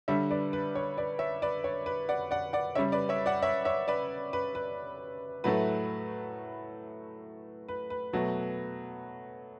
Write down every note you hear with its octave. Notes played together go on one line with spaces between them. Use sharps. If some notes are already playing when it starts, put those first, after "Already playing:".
D3 G3 C#5 E5
B4 D5
B4
C#5
B4 D5
C#5 E5
B4 D5
C#5
B4
D5 F#5
D5 F#5
D5 F#5
C#3 G3 C#5 E5
B4 D5
C#5 E5
D5 F#5
C#5 E5
C#5 E5
B4 D5
B4
B4
A2 F#3 A3 B4
B4
B4
B2 F#3 A3